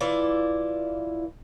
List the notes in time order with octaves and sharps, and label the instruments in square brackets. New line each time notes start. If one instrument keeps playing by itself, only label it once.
[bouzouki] E3 E4 F4 D5